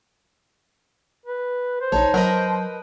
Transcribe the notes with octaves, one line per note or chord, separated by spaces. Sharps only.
B4
C5
A#1 D#4 C#5 A5
F#3 A#4 B4 D#5